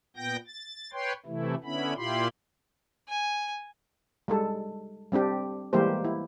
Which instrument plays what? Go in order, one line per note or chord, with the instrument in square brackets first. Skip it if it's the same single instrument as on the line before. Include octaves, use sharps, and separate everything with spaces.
[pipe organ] A#2 B3 G5 G6 A#6
A6
B4 C#5 G5 C6
C3 E3 A3 E4
D3 B3 C#4 E4 B5
A#2 E4 F4 G4 B5 C6
[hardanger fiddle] G#5
[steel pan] G3 G#3 A4
G3 C4 D4 G4
E3 G3 G#3 A#3 G4 C5
E4